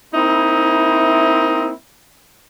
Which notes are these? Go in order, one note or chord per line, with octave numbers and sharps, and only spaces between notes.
A#3 C4 D#4 E4